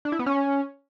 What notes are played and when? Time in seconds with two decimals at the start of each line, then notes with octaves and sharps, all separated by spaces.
0.05 D4
0.12 E4
0.19 B3
0.26 C#4